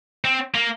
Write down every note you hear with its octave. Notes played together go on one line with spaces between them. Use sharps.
C4
A#3